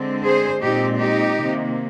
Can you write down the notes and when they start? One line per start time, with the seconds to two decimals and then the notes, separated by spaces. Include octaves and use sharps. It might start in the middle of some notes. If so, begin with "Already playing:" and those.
Already playing: D3 G#3 C4
0.24 G#4 C5
0.60 A#2 G#3 C4 D#4 G4
0.97 D#4 G4
1.34 C3 D#3 A#3